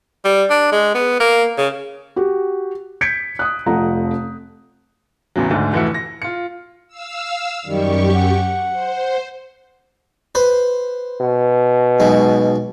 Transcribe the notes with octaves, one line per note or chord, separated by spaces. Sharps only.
G3
D4
G#3
B3
A#3
C#3
F#4 G4
G6 G#6 B6 C#7 D7
D#6 F#6
F1 F2 F3 F#5 A#5
A1 E2 C#3 F#3
D2 G#2 D3
F1 E3 A3 E4 F#4 C#7
A#6
F4 C#7
F5 E6
F#2 D#3 G3 G4 C#6
F#5
C5
B4 C5
B2
B1 G#3